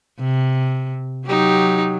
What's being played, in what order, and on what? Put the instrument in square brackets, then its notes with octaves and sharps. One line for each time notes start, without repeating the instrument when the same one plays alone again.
[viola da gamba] C3
[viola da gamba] F#3 [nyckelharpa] D#4 G4